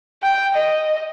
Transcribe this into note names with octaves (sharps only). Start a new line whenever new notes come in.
G5
D#5